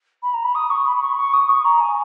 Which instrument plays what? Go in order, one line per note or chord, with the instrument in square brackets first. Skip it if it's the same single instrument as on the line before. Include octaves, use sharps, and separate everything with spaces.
[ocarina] B5
A#5
B5
D#6
C#6
B5
C#6
B5
C#6
D#6
C#6
A#5
G#5